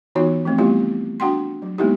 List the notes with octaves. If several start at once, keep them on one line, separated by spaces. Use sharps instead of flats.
E3 B3 D#4 F4 F#4 C#5
F3 A3 C4
G3 A3 B3 E4 F4 G4
D4 F#4 F#5 G5 C6
F#3
G#3 A#3 B3 D#4 E4 G4